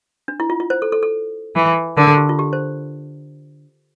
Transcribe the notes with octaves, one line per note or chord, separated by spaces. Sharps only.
D4
E4
F4
F4
C5
A4
A4
A4
E3
D3 A#4
A4
G4
F4
G4
C5